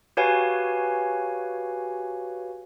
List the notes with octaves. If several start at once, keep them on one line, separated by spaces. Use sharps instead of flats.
F#4 G4 B4 C#5 F5 G#5